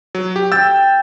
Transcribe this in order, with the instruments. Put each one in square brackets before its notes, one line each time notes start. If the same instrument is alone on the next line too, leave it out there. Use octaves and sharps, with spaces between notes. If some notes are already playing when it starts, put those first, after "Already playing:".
[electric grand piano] F#3
G4
[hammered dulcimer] G5 [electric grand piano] E6 A6